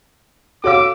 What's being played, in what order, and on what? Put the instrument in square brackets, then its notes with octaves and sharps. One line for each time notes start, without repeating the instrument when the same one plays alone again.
[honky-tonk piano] F#4 E6 [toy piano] A4 C#5 F5 [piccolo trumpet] D6